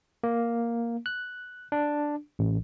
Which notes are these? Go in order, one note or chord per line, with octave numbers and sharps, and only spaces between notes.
A#3
F#6
D4
A1